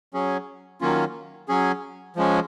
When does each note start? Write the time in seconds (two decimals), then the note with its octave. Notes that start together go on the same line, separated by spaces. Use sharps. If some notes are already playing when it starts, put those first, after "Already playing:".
0.14 F#3 C#4 G#4
0.81 D#3 F#3 A#3 C#4 F4
1.48 F#3 C#4 G#4
2.16 F3 G#3 C#4